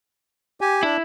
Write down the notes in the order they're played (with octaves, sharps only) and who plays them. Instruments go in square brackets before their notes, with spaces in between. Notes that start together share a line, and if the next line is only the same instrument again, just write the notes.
[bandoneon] G4 G#5
[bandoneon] D4 [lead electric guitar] E4